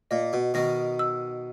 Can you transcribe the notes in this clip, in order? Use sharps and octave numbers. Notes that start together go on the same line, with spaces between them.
A#2 D#5
B2
B2 D#3 D#5
E6